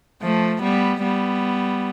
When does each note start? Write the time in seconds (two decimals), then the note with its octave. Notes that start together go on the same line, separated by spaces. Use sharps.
0.22 F3 A3
0.63 G3 B3
1.03 G3 B3